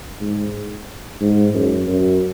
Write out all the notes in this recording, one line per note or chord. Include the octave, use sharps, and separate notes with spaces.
G#2
G#2
F#2
F#2